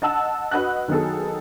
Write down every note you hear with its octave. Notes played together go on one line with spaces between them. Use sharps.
D#5 F#5 A5 E6
F#4 B4 D#5 F#5 F#6
D#3 F#3 B3 G#4 A4